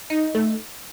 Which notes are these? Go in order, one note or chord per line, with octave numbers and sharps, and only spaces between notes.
D#4
A3